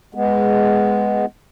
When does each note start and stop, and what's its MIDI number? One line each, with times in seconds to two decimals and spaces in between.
0.15 1.25 56
0.15 1.25 59